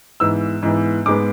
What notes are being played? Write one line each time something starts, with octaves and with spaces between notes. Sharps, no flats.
G#2 E3 B3 E6
G#2 E3 B3
G#2 G#3 B3 D6